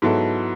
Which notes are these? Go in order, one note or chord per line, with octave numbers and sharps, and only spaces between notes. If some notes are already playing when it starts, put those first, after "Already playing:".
G#2 F#3 B3 E4 A4